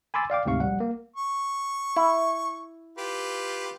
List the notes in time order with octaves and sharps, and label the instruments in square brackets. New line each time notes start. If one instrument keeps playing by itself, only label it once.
[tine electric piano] G#5 B5 C6 D6 E6 A6
D5 F5 G5 D6
D2 G#2 C3 F5 C#6
A#1 G3 F#5
A#3
[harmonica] C#6
[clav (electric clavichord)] E4
[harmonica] F4 G4 B4